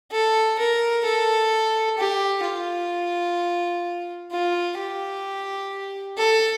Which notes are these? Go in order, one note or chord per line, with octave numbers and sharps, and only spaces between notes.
A4
A#4
A4
G4
F4
F4
G4
A4